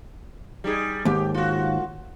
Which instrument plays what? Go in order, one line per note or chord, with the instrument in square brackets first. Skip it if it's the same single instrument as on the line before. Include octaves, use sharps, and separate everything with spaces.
[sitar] G3 D#4 G#4
[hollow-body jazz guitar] D#2 G#2 [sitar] G4
[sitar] F4 F#4